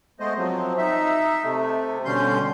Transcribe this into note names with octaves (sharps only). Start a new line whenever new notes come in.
G#3 A3 B3 C5 D#5
F3 F#3 C4
D#4 E5
C3 A3
B2 D3 G3 C#4 C6 G6